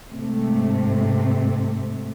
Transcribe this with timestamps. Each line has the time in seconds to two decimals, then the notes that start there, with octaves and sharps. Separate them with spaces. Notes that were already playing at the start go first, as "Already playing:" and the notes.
0.11 G#2 C3 A3